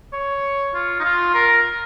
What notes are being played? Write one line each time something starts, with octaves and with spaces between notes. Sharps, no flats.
C#5
F4
D#4
F4
A#4